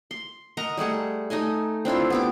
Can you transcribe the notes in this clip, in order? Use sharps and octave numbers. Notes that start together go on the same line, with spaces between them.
C6
A#4 D#5 F#5 A#5
G3 A3 G#4 F#5
A3 D#4 D#5 G#5
C4 D4 E4 F4
B3 G4 D6